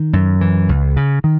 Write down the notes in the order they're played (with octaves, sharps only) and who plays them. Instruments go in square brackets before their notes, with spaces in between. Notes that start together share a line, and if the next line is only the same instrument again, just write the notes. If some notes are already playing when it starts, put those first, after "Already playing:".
Already playing: [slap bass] D#3
F#2
E3
C#2
C#3
D#3